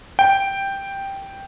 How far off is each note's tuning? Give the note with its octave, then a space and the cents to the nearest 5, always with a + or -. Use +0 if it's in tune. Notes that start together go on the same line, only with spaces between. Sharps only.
G5 +0